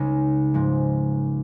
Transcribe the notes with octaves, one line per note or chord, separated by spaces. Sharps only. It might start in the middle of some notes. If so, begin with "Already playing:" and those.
Already playing: C#2 C#3 G#3 C#4 D#4
G#2 F3 G#3